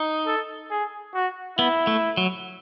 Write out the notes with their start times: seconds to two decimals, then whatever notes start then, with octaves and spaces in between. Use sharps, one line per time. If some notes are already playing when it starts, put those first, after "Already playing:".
Already playing: D#4
0.26 A4
0.71 G#4
1.14 F#4
1.58 B3 E4
1.87 A3
2.17 F#3